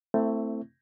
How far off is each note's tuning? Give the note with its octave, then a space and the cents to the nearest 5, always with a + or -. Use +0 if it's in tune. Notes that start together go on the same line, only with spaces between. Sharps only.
A3 +20 C4 +0 E4 +0